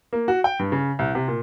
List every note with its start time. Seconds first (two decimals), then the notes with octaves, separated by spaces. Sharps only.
0.13 A#3
0.28 F#4
0.44 G5
0.59 G2
0.72 C#3
0.99 C2
1.15 C3
1.28 A#2